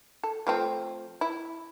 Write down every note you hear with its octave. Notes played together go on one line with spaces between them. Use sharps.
A4
F3 A3 C4
E4